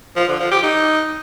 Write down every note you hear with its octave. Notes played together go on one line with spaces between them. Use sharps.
F3
D3
F3
G4
D#4